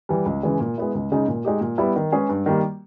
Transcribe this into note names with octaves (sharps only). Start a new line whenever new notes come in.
E3 G3
C#2
C#3 E3 G#3
A#2
G#3 B3 E4
C#2
C#3 G#3 D#4
A#2
G#3 D#4 G4
A#2
G3 B3 E4
D#3
G#3 C#4 G#4 B4
G2
D#3 G3 A#3